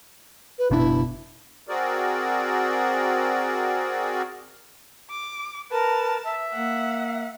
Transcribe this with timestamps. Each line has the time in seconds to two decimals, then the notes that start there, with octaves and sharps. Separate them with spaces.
0.59 B4
0.71 F#1 B2 D4 E4
1.67 C4 F#4 G#4 A#4 D5
5.10 D6
5.72 A#4 B4 A5
6.24 E5
6.54 A#3 F#5